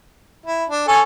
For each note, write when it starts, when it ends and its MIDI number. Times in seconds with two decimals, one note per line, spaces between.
0.46 0.64 64
0.69 0.85 62
0.88 1.01 61
0.88 1.01 69
0.88 1.01 80